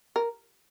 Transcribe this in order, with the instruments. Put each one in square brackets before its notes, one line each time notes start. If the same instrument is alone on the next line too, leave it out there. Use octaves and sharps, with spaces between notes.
[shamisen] A#4